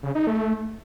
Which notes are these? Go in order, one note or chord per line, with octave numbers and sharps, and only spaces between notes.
C#3
D#4
A3